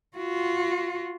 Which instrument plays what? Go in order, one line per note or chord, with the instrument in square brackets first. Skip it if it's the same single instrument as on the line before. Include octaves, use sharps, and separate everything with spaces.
[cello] F4 F#4